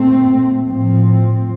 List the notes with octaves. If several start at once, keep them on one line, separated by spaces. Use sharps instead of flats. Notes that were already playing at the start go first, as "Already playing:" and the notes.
Already playing: A#2 A3 C4
A2 F3 C4